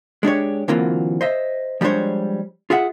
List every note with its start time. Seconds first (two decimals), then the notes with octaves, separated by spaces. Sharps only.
0.23 G#3 D4 G4 C#5
0.68 D3 E3 F#3 A#3 C4 F4
1.21 C5 D#5 E5
1.81 F3 G3 G#3 D4 C5 C#5
2.70 F4 G#4 E5 F#5